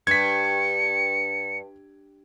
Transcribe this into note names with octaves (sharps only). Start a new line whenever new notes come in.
G2 G#6 B6 C#7